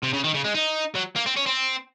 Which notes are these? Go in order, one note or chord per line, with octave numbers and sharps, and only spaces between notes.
C3
C#3
D#3
C#3
G#3
D#4
F#3
A#3
C4
C#4
C4